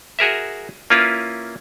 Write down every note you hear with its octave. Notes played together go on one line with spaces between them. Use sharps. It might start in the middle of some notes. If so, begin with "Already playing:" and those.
F#4 G#4 A#4 E5
A#3 C#4 E4 F4 B4